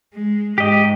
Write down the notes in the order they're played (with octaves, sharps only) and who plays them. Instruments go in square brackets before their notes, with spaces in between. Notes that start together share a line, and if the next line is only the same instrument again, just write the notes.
[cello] G#3
[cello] G#2 [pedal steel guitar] G4 D#5